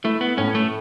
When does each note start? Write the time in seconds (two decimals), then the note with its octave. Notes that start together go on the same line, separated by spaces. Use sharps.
0.04 A3 E4
0.21 B3
0.38 A2 C#4
0.55 A3